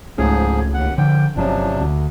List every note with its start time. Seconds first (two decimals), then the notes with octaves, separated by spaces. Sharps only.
0.18 C#2 G#2 F3 A3 C#4 G#4
0.74 D#2 F#5
0.98 D3 F3 G5
1.36 G1 C3 F3 F#3 C#4 D4
1.80 D2